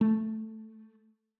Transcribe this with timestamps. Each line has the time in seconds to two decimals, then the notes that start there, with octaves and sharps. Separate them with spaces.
0.01 A3